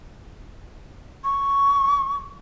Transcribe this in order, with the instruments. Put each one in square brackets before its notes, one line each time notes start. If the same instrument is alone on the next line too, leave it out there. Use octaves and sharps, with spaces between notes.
[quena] C#6